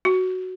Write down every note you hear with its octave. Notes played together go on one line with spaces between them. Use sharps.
F#4